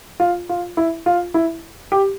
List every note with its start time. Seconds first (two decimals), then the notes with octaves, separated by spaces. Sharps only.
0.20 F4
0.49 F4
0.77 E4
1.06 F4
1.34 E4
1.92 G4